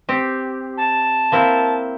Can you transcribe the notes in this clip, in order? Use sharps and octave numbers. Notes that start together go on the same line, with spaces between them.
C4 G4
A5
A#3 C4 E4